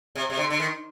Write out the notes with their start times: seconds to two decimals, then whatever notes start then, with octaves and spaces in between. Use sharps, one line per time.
0.15 C3
0.30 C3
0.38 D3
0.50 D3
0.60 D#3